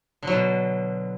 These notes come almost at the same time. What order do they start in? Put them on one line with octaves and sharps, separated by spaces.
D3 F#3 B2